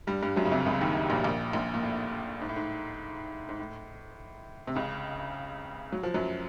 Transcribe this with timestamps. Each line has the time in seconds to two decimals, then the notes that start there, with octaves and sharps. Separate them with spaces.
0.07 G2 G3
0.22 G2 G3
0.36 F#2 F#3
0.45 C#3
0.52 C2 C3
0.66 C#2 C#3
0.80 D#2 D#3
1.10 A#1 A#2
1.24 A#1 A#2
1.53 A#1 A#2
1.74 A#2
1.83 A2
2.41 G#2
2.49 A2
2.56 G#2
3.49 G#2
3.59 A2
4.67 C3
4.76 C#2 C#3
5.92 F#3
6.03 F3
6.14 F#2 F#3